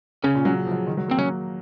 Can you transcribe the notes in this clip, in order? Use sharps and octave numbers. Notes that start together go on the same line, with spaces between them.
C#3 C#4
A#2
F#3
F3
F#3
D#3
F#3
A#3
C4
F#3 C#4